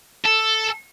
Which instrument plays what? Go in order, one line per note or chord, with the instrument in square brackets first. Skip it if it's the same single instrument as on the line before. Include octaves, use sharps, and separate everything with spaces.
[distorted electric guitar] A4